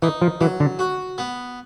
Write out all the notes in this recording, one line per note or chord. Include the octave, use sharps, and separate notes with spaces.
E3 D#4
F3
E3 F#3
D3
F#4
B3